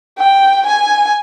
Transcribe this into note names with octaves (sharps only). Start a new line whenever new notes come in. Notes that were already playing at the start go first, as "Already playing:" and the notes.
G5
G#5